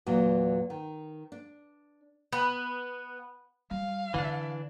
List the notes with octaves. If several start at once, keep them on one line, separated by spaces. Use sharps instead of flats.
E2 A#2 F#3
D#3
D4
B3
G3 F5
D3 E3 D4